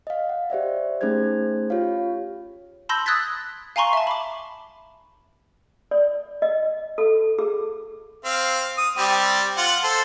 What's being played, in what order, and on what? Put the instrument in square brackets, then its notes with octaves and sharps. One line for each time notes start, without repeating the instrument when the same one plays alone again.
[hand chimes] D#5 F5
F#5
G4 C5 D5 E5
A3 C#4 D#4 G#4 C5 G#6
F4 G4 C#5 F5
[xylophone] A5 B5 C6 E6 G6 A#6
D#6 E6 F#6 G#6 A6 B6
F5 G#5 A#5 C6 C#6
E5 A5
B5 D6
[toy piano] D5
D#5
A4
G#4
[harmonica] C4 F5
D#6
G3 C4 G4
F4 F#5
A4 C5